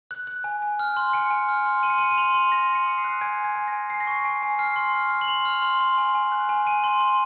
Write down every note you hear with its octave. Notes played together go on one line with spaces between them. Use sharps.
F#6
F#6
G#5
G#5
F6
C6
G#5 C#7
G#5
F6
C6
C6 D#7
C#7
C6 D#7
D#7
C6 F7
C6
C6 A#6
C6
C#7
D#6
C7
F#6
G#5 G#6
G#5
G#6
G#5
A#6
G#5
G#5 C7
A#6
C#6 C7
G#5
G#5
F6 C7
C6
F6
F6
F#7
C6 F7
F6
C6
C6
G#5
G#5
F#6
G#5
G#5 D#7
C6
C6